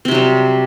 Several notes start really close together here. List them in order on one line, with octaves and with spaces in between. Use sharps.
C4 C3 F#3 G3